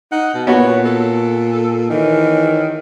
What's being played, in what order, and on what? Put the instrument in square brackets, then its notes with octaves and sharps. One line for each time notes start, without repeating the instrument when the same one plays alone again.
[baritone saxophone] D#4 [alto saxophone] F#5
[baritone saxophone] B2
[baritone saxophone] A#2 [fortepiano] B3 F#4 [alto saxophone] C#5
[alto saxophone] A4
[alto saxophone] D#3 [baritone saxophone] E3